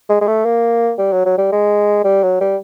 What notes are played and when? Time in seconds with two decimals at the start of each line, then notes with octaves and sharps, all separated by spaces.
0.10 G#3
0.21 G#3
0.27 A3
0.45 A#3
0.99 G3
1.12 F#3
1.26 F#3
1.38 G3
1.52 G#3
2.04 G3
2.23 F#3
2.41 G3